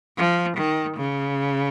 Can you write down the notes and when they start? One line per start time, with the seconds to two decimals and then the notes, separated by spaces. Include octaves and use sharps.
0.18 F3
0.58 D#3
0.97 C#3